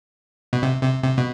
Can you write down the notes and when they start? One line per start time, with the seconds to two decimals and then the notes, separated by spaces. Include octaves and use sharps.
0.53 B2
0.63 C3
0.83 C3
1.04 C3
1.18 B2